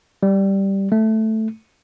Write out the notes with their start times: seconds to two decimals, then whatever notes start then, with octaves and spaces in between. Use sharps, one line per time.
0.23 G3
0.92 A3